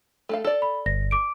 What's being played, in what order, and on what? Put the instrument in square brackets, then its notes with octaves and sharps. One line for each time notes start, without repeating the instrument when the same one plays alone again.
[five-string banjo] A3 A4 F5
A4 D5
[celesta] B5
[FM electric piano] G1 [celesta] A#6
[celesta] D6 D7